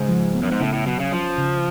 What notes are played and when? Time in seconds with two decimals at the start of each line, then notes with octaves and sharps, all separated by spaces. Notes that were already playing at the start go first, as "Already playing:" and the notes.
Already playing: G#2 C#3
0.09 F3
0.34 B3
0.43 F#2
0.52 G#2
0.60 A2 C#3
0.73 A2
0.86 B2 F#3
1.00 C#3
1.12 F3 C#4
1.38 C#3